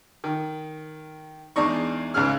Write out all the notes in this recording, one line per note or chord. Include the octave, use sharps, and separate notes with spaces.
D#3
E2 G#3 D4 D#4 C#6
C#2 G#2 C#3 G#4 F6